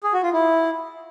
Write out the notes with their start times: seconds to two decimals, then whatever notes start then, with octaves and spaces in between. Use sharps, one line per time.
0.03 G#4
0.13 F#4
0.23 F4
0.33 E4